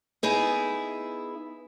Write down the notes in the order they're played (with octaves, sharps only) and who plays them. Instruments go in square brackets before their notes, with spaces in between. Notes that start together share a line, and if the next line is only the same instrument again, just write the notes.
[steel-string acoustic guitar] B3 D#4 E4 G#4